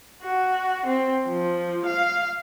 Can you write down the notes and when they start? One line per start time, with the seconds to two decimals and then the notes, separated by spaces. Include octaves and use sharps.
0.21 F#4
0.86 C4
1.27 F3
1.85 F5